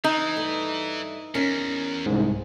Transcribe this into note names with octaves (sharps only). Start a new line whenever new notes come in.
E3 D#4
G2 A3
E2 C#4 A#4
C2 G#2